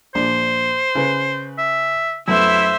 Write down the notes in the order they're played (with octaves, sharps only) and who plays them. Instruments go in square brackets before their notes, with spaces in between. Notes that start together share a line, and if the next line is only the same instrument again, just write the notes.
[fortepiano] A#1 D4 C6 [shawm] C5
[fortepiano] C#3 B4
[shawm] E5
[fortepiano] F#2 A3 B3 [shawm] E4 [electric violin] C5 E5